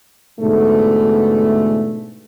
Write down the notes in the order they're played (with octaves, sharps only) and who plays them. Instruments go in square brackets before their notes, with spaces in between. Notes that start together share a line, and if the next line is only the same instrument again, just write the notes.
[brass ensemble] G#2 B2 D3 E3 A3